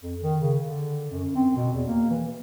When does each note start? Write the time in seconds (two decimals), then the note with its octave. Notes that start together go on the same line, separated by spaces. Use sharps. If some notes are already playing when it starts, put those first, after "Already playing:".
0.02 F2
0.23 D#3
0.40 C#3
0.60 D3
1.10 F#2
1.35 C4
1.56 B2
1.72 E2
1.87 A#3
2.09 E3